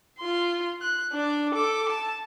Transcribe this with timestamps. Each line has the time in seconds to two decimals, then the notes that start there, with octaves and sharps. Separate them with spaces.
0.18 F4 C6
0.81 F#6
1.12 D4 D5
1.54 A4 D6
1.89 A5